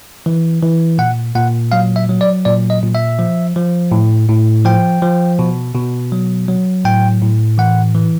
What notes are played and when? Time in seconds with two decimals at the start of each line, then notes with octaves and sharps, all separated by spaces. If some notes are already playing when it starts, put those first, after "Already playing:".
0.26 E3
0.63 E3
0.98 A#2 F#5
1.35 A#2 F#5
1.72 F#3 F5
1.96 E5
2.09 F#3
2.21 D5
2.45 A#2 D5
2.70 D#5
2.83 A#2
2.95 E5
3.19 F3
3.56 F3
3.92 A2
4.29 A2
4.65 F3 G5
5.02 F3
5.39 B2
5.75 B2
6.12 F#3
6.48 F#3
6.85 A2 G5
7.22 A2
7.58 E3 F#5
7.95 E3